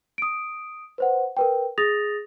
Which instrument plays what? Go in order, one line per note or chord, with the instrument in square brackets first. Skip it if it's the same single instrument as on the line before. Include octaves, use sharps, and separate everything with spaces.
[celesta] D#6 D7
B4 C5 F#5
A#4 B4 G5
G#4 D#6 A6 A#6 F7